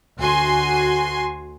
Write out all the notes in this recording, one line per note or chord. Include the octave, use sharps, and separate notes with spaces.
D2 F#4 G#5 C6